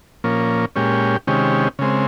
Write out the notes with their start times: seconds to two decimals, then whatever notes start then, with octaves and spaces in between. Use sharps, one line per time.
0.24 A#2 F3 A#3 C#4
0.76 A#2 G#3 C#4 G4
1.27 C3 D#3 G#3 C#4 G4
1.79 C#3 G#3 C4